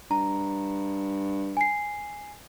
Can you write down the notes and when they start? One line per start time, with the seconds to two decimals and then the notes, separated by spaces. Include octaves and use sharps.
0.11 G2 A#5
1.57 G#5 C7